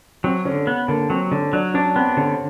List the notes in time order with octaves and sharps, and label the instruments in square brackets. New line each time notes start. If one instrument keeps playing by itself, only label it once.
[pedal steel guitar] F#3 [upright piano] C4
[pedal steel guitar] D3 [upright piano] C#4
[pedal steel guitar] B3
[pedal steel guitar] D3 [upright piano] A#3
[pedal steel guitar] F#3 [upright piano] C4
[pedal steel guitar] D3 [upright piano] C#4
[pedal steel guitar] F#3 [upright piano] D4
[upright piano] C#4 [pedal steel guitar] D4
[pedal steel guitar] B3 [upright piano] C4
[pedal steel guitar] D3 [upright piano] C#4